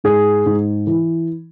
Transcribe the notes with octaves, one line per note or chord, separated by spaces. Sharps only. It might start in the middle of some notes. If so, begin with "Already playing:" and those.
G#2 G#4
G#2
E3